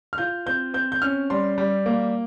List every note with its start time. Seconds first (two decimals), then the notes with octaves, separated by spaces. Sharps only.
0.13 F6
0.18 F4 G6
0.46 C4 G6
0.74 C4 G6
0.92 G6
1.02 C#4 F6
1.30 G3 C6
1.58 G3
1.86 A#3